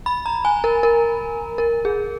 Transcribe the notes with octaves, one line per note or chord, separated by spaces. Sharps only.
B5
A#5
G#5
A#4
A#4
A#4
G#4